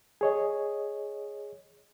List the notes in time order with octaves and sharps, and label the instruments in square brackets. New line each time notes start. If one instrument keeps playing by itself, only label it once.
[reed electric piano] G#4 C#5 D#5